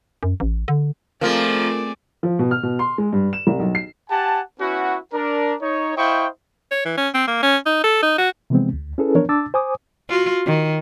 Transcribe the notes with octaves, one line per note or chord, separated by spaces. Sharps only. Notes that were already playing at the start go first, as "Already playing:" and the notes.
F#2
A1
D3
F3 A3 A#3 C4 F4 G#4 A#4 D5
F3
B2
F6
B2
C6
G#3
G2
E7
C2
B1
C7
G4 F#5 G#5 A5
B3 C#4 E4 F#4
D4 A#4
D#4 C#5
E4 C5 D#5 F5 G5 C#6
C#5
E3
C#4
C4
A#3
C#4
D#4
A4
D#4
F#4
C3 E3 F3 G#3 B3 C4
D2
C#4 E4 G#4 A4 B4
E3 F3 B3 D4 A#4 C#5
D4 A5 D6 E6 A6
C5 G#5 D6 D#6
F4 F#4
D#3